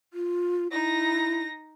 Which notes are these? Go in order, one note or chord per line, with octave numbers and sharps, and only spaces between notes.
F4
D#4 E4 A#6